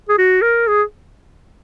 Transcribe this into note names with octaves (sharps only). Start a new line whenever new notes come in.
G#4
F#4
A#4
G#4